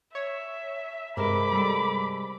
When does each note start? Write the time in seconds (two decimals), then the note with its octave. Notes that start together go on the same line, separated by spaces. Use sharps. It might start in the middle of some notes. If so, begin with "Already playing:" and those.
0.15 C#5 E5
1.17 G2 C3 G#3 A#4 B5 D6
1.53 G3 A4